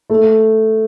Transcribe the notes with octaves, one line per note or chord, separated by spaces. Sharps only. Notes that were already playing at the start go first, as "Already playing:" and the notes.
A3